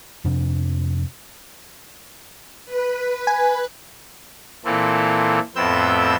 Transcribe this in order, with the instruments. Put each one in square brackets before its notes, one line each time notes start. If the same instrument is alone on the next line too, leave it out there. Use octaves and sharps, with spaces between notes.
[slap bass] F2 C3 D4
[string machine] B4
[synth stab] G#5
[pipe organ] A#2 E3 A#3 C4 A4
F2 A2 B3 C4 E6 G6